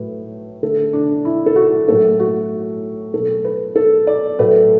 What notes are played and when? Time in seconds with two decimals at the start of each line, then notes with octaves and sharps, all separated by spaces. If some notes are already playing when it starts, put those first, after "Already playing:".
Already playing: A2 F#3 A3 B4
0.63 D3 A3 A4
0.93 D4
1.25 E4
1.46 A4
1.56 F#4
1.88 A2 F#3 A3 A4
2.20 F#4
3.13 B2 F#3 A3 A4
3.45 B4
3.76 A4
4.07 D5
4.39 A2 F#3 A3 B4